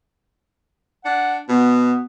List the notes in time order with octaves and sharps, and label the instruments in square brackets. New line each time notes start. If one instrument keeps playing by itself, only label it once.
[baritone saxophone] D4 [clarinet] F#5
[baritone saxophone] B2 [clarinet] B3